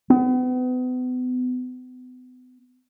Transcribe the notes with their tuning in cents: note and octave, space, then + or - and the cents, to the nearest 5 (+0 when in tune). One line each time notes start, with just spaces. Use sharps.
B3 +35